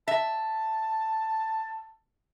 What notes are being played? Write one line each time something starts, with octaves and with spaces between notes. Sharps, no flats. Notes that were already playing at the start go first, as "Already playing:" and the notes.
E5 A5